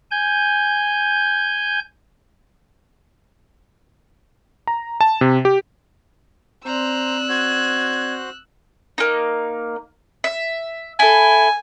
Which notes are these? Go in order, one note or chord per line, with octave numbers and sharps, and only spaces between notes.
G#5 G6
A#5
A5
C3
G4
C4 C5 D5 A#5 E6 F#6
F#4 C5 G#6
A#3 D#4
E5
E4 A4 G#5